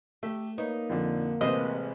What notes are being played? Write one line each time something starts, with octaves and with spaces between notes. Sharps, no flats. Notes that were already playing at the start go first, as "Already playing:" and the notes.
A3 G4
A#3 D#4 B4 C#5
F2 A#2 D3
A1 C3 G#3 B4 C5 D#5